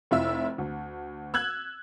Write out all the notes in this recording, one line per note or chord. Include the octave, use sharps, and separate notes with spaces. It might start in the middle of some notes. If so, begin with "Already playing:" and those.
F1 E4 F4 E5 E6
D2
E6 F#6 G#6 F#7